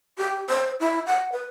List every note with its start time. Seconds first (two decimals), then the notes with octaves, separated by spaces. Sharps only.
0.18 G4
0.49 C5
0.80 E4
1.07 F#5
1.32 B4